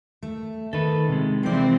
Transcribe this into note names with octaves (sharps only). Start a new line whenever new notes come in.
A3
D#3 A4 B4
C3 G#3
E3 F3 C4 C5 D5